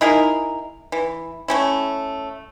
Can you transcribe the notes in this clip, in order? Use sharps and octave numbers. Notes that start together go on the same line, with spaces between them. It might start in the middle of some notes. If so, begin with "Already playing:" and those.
D#4 E4 G#4 A#4
E3
A3 C#4 E4